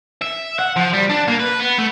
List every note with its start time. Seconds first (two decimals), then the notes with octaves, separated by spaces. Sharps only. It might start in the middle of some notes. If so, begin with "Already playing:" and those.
0.22 E5
0.59 F#5
0.76 F3
0.93 G3
1.09 D4
1.28 A#3
1.40 B4
1.60 B3
1.78 A3